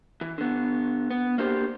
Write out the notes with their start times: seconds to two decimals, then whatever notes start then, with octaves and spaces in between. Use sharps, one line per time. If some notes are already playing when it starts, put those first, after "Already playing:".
0.21 E3
0.38 D3 B3
1.11 B3
1.38 A#3 D4 G4 C5